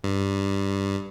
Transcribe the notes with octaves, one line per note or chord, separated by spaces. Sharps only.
G2